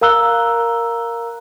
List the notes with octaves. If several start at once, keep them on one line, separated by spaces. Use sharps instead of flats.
A#4 F5 A#5 E6 F#6 G7